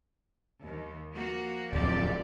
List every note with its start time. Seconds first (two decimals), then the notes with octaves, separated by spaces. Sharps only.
0.64 D#2
1.12 F3 A#3 F#4
1.73 D1 F2 G4 D5